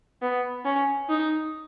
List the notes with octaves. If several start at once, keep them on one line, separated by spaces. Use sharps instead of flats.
B3
C#4
D#4